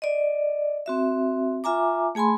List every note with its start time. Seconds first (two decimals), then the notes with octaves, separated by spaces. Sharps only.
0.02 D5 D#5
0.86 C4 F#4 E5
1.64 F4 E5 G#5 A#5 D6
2.15 A3 G#4 G#5 B5 C6